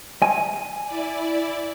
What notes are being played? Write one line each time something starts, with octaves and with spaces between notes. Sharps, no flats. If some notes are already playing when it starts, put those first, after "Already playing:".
G#5
E4 D5